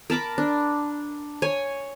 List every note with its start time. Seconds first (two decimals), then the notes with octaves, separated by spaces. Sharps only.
0.10 A#4 A5 B5 D6
0.38 D4
1.42 C#5 G#5